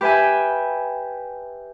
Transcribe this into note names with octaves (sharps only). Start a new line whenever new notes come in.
G4 B4 E5 G5 G#5